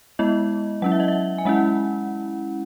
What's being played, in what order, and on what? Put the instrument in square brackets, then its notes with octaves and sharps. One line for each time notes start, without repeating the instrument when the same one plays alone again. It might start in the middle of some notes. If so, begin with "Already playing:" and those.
[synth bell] G#3 B3 E4 D#5
F#3 C#4 E4 F#5
E5
D#5
E5
G#5
G#3 C#4 E4 F#5